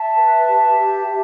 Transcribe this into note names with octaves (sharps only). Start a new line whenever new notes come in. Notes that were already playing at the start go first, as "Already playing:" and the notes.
Already playing: E5 A5
B4
G4
G4
G4